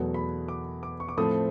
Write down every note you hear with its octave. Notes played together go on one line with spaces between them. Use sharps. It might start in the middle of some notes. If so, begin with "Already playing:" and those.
Already playing: E2 B2 F#3 A3
B5
D6
D6
C#6
D6
A2 F3 A3 C4 D#6